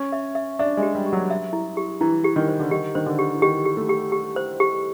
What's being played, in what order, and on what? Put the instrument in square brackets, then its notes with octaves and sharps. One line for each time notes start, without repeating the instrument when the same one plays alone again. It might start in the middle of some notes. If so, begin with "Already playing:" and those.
Already playing: [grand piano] C#4
[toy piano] E5
E5
[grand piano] D4 [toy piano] E5
[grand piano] G#3
[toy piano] G4
[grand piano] G3
[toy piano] G4
[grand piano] F#3
[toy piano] E5
E4
G4
[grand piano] E3 [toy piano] E4
[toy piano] G4
[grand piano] D#3
[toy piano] C5
[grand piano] D3
[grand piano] D#3 [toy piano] G4
[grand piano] D#3 [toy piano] C5
[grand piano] D3
[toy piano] G4
[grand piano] E3
[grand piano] D#3 [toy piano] G4
[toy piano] G4
[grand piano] A3
[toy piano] G4
G4
C5
G4